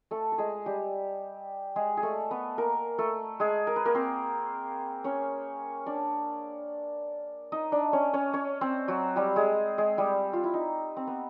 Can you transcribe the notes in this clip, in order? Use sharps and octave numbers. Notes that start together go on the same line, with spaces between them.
A3 A4
A4
G#3 G#4
G3 G4
G#3 G#4
G#4
A3 A4
B3 B4
A#3 A#4
A3 A4
G#3 G#4
A#4
B4
A#3 A#4
C4 C5
C#4 C#5
D4 D5
D#4 D#5
D4 D5
C#4 C#5
C#4 C#5
C#4 C#5
C4 C5
F#3 F#4
G3 G4
G#3 G#4
G#3 G#4
G3 G4
F4
E4
D#4
C4
B3